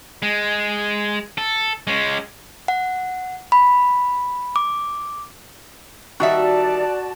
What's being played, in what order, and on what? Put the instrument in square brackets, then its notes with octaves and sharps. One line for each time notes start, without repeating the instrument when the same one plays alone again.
[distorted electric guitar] G#3
A4
G#3 C#4
[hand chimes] F#5
B5
D6
[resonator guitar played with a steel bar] D#3 G3 E5 [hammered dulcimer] F#4 [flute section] D5 A5